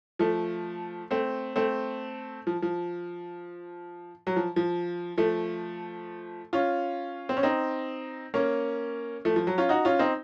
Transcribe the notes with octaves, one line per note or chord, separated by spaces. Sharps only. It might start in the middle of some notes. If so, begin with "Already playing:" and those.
F3 A3
A3 C4
A3 C4
F3
F3
F#3
F3
F3
F3 A3
C#4 F4
C4
C#4
C4 D#4
A#3 C#4
F3 A3
F3
F#3
C#4 F4
D#4 F#4
C#4 F4
C4 D#4